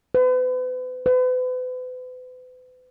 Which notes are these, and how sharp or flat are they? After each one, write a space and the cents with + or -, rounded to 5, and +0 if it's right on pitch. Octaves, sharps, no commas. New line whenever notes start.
B4 +40
B4 +40